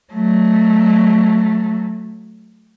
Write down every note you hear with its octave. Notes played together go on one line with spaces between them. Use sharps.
F#3 A3